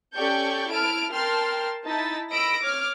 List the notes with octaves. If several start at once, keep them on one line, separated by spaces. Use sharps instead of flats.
C#4 G4 A4 D5 C#6 G6
E4 A5 F6 D7
A#4 G5 A5 C6 F6
D#4 E4 A5 A6 B6
D#5 B5 E6 A#6 D7
C#5 D6 F6